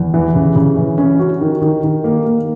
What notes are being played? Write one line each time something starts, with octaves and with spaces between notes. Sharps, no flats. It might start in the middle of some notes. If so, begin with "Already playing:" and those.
Already playing: E2
E3
C#3
C#3
E3
C#4
F#4
D#3
D#3
D#3
A#3
A#3